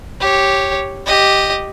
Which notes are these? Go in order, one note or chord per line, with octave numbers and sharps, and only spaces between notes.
G4 C#5
G4 D#5